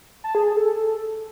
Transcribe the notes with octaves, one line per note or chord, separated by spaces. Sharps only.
A5
G#4
G#4
A4